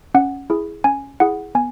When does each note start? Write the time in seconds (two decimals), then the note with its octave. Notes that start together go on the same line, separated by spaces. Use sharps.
0.14 C#4 F#5
0.50 E4 G#4
0.84 C#4 G#5
1.20 E4 G#4 F#5
1.55 B3 G#5